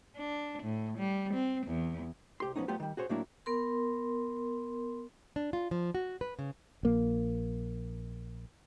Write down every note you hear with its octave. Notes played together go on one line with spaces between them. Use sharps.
D4
A2
G3
C4
E2
C2 G4 C6
F3 F#3 B3 C#4 D#4
F#3 A3 B3 F4 G4
D#3 G3
F#4 G#4 C5 C#5
A2 F#3 A#3 D4 E4
B3 A#4 C6
D4
F4
F3
F#4
B4
C#3
A#1 A#3